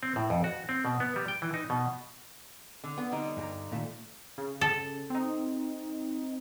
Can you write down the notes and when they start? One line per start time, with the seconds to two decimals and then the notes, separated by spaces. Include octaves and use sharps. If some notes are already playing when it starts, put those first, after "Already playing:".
0.03 C4
0.16 A2
0.30 F2
0.44 F#4
0.69 C4
0.85 B2
1.00 B3
1.16 G3
1.28 G5
1.42 E3
1.54 D#4
1.70 B2
2.84 D3
2.98 B3
3.11 D3 G3 D#4
3.37 G2 G#4 A#5
3.72 A#2 D#3 A3
4.38 C#3
4.61 A4
5.10 C4 D#4